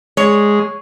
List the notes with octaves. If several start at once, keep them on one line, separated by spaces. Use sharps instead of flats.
G#3 C#5